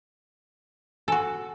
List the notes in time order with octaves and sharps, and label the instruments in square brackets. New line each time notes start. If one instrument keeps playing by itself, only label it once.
[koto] F#4 A4 [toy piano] G#5